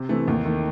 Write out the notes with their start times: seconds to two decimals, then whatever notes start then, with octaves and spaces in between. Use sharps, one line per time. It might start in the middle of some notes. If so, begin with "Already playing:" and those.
Already playing: C3
0.09 E3 A3 C4
0.28 D#2
0.45 D#3 A3